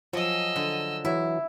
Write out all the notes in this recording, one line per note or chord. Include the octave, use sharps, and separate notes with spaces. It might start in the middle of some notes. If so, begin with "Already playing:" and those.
F3 F#3 G#4 D#5 E6
D3
E3 F#3 E4